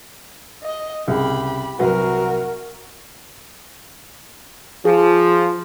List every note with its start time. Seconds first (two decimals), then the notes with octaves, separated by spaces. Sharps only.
0.64 D#5
1.07 C2 C#3 G4 B5
1.79 C2 F#3 F#4 A#4 B4
4.85 F3 G#4